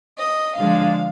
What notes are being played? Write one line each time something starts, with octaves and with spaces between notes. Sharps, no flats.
D#5
D3 F3 G#3 D4 F5